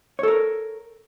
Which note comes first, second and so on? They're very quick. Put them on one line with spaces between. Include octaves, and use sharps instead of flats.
C#5 A4 A#4